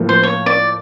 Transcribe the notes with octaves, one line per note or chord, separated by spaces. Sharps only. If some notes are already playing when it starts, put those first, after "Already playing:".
Already playing: A2 F3 A#3
C5
C#5
D5